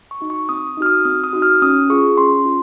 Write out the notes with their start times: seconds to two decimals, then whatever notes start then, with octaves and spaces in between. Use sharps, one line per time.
0.11 C#6
0.21 D#4 F#4
0.30 C#6
0.49 C4 D#6
0.77 D#4 F#4 F6
0.86 D#6
1.05 C4 D#6
1.24 D#6
1.33 D#4 F#4
1.42 F6
1.62 C#4 D#6
1.90 F4 G#4 C#6
2.17 C#4 C6
2.45 F4